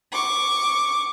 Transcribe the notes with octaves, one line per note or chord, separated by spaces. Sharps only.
C#6 D6